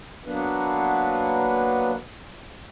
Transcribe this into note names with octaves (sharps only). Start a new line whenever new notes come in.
F#3 A#3 B3 D4 B4